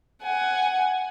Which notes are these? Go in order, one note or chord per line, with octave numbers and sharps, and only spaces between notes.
F#5 G#5